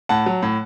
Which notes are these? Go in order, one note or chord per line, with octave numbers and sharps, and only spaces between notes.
A2 F#5 A5
F#3
A2